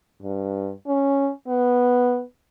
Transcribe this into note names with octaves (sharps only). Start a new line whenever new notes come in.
G2
C#4
B3